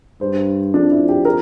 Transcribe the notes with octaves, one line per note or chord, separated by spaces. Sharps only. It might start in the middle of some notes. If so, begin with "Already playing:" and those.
G2 C5
F2 D4
E4
G4
A#4